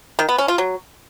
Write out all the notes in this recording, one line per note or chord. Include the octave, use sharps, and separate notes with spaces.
D#3
B3
C#4
F4
F#3